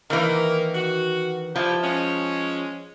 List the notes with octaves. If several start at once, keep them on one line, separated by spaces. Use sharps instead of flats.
D#3 E3 A#3 A#4
F#4
F3 E4 G4
G#3 C#4